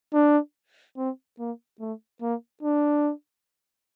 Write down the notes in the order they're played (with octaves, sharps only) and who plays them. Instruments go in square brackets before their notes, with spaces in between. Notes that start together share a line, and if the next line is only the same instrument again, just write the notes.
[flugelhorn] D4
C4
A#3
A3
A#3
D4